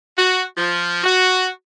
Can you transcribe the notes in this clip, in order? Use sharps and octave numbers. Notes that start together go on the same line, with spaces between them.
F#4
F3
F#4